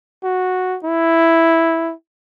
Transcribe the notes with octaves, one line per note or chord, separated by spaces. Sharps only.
F#4
E4